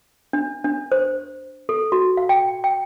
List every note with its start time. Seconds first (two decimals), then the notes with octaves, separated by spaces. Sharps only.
0.33 D4
0.64 D4
0.92 C5
1.69 A4
1.92 F#4
2.17 F5
2.29 G5
2.64 G5